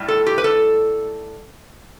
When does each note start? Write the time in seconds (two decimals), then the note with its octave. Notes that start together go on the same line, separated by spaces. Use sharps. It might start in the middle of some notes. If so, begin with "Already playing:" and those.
Already playing: A2 G3
0.08 A4
0.26 G4
0.38 B4
0.44 A4